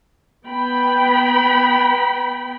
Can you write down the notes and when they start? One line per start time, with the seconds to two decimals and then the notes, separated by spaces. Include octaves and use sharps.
0.47 B3 G5 B5